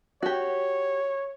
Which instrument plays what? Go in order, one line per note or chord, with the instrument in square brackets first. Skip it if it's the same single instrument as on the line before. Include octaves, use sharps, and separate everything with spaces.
[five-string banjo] F#4 G4 [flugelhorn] C#5